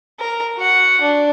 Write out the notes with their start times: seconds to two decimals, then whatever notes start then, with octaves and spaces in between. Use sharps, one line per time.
0.19 A#4
0.57 F#4 F#5
1.01 D4